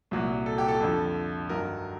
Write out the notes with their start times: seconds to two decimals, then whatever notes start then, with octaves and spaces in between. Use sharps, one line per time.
0.11 C2 A#2 F#3
0.46 A4
0.58 G4
0.68 A4
0.81 F2 D3 F3
1.49 G2 D#3 F#3 A#4